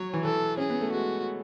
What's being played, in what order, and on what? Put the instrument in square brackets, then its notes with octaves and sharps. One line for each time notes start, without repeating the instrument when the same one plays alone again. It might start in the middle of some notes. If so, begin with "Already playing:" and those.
Already playing: [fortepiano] F#3 [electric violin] C#5
[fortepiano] E3
[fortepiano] E3 [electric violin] A4
[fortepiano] C#4 [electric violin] G#4
[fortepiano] B3
A3
[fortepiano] G#3 [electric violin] F#4